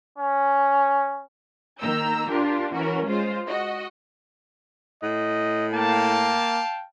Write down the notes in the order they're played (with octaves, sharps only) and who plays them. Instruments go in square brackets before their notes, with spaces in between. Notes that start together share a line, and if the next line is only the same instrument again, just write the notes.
[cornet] C#4
[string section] D#3 A#3 A#5 E6 G6
D4 F4 G4 A#4
E3 C#4 F#4 A#4
G#3 F4 C5
F#4 D#5
[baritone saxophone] A2 [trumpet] D#5
[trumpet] A#3 [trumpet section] F5 G5 A5